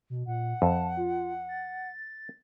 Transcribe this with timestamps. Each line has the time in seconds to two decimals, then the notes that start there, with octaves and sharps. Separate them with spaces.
0.10 B2
0.27 A#2 F#5
0.62 F2 A5
0.97 F4
1.49 A6